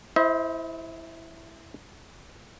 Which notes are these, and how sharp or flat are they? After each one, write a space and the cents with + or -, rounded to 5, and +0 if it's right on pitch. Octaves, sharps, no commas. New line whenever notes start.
E4 +0 C5 +0 D#5 +45